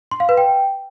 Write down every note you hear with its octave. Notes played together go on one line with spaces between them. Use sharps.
C6
F5
B4
G5